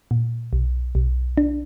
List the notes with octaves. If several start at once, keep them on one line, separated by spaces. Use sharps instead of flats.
A#2
B1
B1
D4